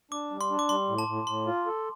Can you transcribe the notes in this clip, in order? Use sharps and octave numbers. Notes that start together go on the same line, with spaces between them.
D4 D6
G3
C6
D4
D6
G3 C6
A2
A5
A2
A2 C6
F4
A4